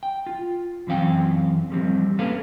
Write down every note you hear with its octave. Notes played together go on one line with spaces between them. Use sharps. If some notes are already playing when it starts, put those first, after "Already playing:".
G5
F4
F#2 E3 C4 F5 G5
F3 G3 C4
A#3 C#4 A4 B4 F5